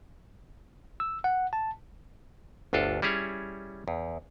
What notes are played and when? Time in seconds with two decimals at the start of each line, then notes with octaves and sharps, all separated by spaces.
1.00 E6
1.24 F#5
1.53 A5
2.73 G1 D2 D4 F4 A4
3.02 G3 C#4 E4 G#4 C#5
3.88 E2